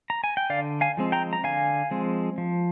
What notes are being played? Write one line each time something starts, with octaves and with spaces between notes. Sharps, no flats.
A#5
G#5
G5
D3 D5 F5
F5 G#5
F3 G#3 C4
G5 A#5
A#5
D3 F5 G#5
F3 G#3 C4
F3